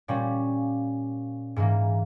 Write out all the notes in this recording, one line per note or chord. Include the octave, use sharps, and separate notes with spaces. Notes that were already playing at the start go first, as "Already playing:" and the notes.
A#2 G3 C#4
G#2 E3 A#3